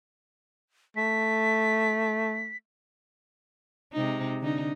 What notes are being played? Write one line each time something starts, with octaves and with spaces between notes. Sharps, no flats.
A3 B6
C3 G#3 D#4
D3 D#4